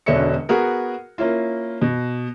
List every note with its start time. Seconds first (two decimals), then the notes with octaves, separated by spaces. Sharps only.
0.06 E1 B2 D3 C#4 E5 C#7
0.49 B3 F#4 G#4 A#4
1.18 A#3 C#4 E4 F4
1.82 B2